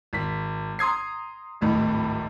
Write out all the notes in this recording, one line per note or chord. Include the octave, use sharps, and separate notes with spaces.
G#1 B6
A#5 C6 D#6 G#6 C7
D1 G#1 A2 D#4